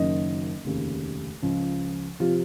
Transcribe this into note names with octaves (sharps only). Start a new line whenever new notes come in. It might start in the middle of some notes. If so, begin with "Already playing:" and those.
Already playing: F#1 F#2 D#3 F#3 D#5
F1 D#2 C#3
C#2 C#3 F3
C3 F3 F4